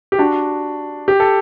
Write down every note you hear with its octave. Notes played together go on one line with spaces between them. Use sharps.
G4
D4 F#4
G4
A4